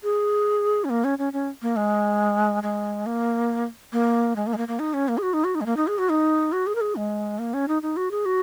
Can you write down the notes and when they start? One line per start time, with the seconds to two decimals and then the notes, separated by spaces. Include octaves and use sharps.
0.03 G#4
0.84 C#4
0.90 A#3
1.04 C#4
1.18 C#4
1.33 C#4
1.62 A#3
1.76 G#3
2.63 G#3
3.06 A#3
3.93 A#3
4.36 G#3
4.47 A#3
4.53 G#3
4.58 A#3
4.68 A#3
4.79 D#4
4.94 C#4
5.08 A#3
5.18 G#4
5.23 F#4
5.34 D#4
5.44 F#4
5.55 D#4
5.61 G#3
5.66 A#3
5.77 D#4
5.87 G#4
5.98 F#4
6.09 D#4
6.52 F#4
6.67 G#4
6.75 A#4
6.81 G#4
6.96 G#3
7.39 A#3
7.54 C#4
7.68 D#4
7.82 D#4
7.97 F#4
8.11 G#4
8.26 F#4